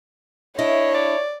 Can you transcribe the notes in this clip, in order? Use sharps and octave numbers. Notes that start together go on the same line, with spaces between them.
D4 E4 C#5 D#5
D5